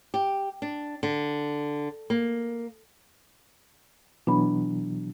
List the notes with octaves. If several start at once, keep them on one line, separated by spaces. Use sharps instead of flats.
G4
D4
D3
A#3
B2 E3 F#3 D4 B5